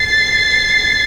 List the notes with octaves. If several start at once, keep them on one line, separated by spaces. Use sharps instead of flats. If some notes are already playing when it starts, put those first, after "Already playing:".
Already playing: A6 C7